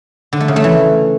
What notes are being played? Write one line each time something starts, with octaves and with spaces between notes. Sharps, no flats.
D3
A3
C#3
A3
E3